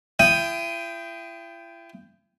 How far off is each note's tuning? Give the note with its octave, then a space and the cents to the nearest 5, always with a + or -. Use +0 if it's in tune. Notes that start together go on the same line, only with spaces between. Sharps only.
E4 +40 G5 +0 D#6 +0